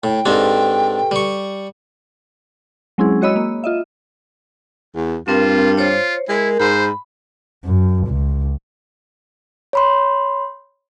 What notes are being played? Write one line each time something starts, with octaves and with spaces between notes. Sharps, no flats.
A2 G5
G#2 C4 D4 G4 A4 B4
G3 C#6
F#3 G#3 C4 C#4 E4 G#4
G#3 F#4 C#5 D#5 B5 E6
A#3
F4 D#5 E5
E2
G2 C4 F4 A#4
F4 C5 C#5
G#3 E4 A#4
G#2 C5 B5
F#2
C#2
C#5 B5 C6